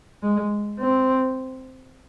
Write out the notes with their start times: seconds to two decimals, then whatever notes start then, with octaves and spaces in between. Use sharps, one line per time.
0.23 G#3
0.80 C4